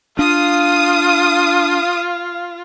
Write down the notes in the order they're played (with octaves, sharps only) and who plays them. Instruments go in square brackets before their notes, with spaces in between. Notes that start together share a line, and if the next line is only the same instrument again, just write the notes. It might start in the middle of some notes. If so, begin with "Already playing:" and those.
[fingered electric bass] D4 [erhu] F4 [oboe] F5 [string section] D#6